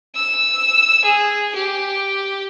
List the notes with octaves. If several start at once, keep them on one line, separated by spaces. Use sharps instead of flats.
E6
G#4
G4